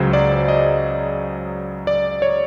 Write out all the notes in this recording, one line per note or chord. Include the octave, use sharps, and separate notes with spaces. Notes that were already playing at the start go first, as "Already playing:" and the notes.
Already playing: C#2 C#3 F#3 C5
D5
D#5
D5
C#5